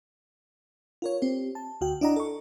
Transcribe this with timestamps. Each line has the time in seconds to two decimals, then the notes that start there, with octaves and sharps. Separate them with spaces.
1.02 F4 A#4 C#5
1.22 C4 G4
1.55 A5
1.81 D2 F#4 G5
2.01 D4 E4 D5 D#5 F#5 A#5
2.16 A4 C#6